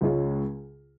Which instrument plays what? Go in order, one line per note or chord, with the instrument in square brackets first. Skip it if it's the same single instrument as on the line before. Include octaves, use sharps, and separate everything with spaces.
[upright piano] C#2 C#3 G#3 C#4 F4